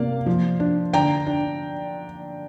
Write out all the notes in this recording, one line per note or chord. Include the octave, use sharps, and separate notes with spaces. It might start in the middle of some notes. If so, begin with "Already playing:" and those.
Already playing: C3 A#3 D5 F5
F3
D4
D3 G5 A#5
D4